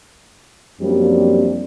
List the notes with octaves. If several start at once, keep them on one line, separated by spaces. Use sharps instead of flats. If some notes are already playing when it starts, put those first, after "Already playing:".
F#2 F3 G3 A#3 C4 D4